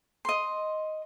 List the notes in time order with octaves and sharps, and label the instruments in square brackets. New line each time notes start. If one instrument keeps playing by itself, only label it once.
[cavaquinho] D#5 C6